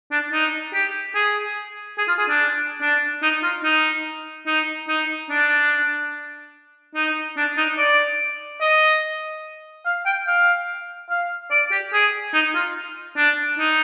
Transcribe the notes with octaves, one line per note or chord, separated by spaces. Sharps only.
D4
D#4
G4
G#4
G#4
F4
G#4
D4
D4
D#4
F4
D#4
D#4
D#4
D4
D#4
D4
D#4
D5
D#5
F5
G5
F5
F5
D5
G4
G#4
D#4
F4
D4
D#4